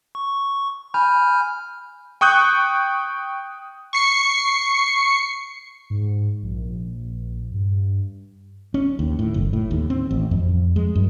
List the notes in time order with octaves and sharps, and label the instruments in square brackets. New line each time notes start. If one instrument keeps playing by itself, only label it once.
[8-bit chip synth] C#6
[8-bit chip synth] G#5 F6 G6 [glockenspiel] B5
[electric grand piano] G5 C#6 D#6 F#6 G6
[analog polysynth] C#6 C7 C#7
G#2
A#1
G2
[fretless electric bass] C#4
D#2
A2
F#1
A2
D#2
C4
A1
F2
G#3
F#2